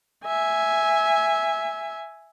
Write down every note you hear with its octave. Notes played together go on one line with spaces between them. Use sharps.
E5 G#5